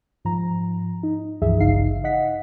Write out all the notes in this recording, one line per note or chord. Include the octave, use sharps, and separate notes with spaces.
G#2 F3 A#5
D#4
C#2 G2 E3 F3 G#4 E5
G#1 G2 C#3 D#4 F5 C7
D#5 F#5 B6